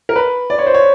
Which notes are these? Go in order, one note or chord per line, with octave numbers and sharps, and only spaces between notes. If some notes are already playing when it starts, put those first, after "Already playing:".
A#4
B4
D5
C#5
C5
C#5